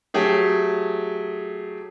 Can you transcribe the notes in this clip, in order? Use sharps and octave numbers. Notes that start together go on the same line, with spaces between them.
F#3 A3 G4 G#4 E5